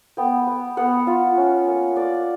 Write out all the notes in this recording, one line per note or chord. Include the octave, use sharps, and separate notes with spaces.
B3 G5
B3
B3 F#5
F4
C#4
A#3
A#3 D5